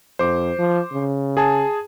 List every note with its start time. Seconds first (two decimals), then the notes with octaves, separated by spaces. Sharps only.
0.19 F2 C5 D6
0.59 F3
0.93 C#3
1.37 G#4 G#5 A5